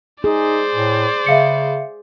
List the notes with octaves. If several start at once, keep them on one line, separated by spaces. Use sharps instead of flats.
D#4 G#4 C5 D5
A2
C#3 E5 F5 C#7